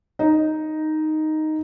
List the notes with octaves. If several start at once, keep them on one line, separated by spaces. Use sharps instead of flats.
D#4 D#5